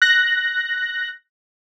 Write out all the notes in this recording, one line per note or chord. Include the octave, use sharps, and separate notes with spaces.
F#6 A#6